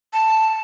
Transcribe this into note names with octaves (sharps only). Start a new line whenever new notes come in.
A5